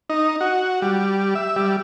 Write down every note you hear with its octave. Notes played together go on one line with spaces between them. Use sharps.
D#4
F#4
G3
E5
G3